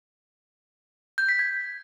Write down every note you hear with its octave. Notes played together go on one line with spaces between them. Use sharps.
G6
B6
G#6